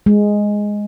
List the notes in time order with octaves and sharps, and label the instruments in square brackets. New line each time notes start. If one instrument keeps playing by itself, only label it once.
[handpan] G#3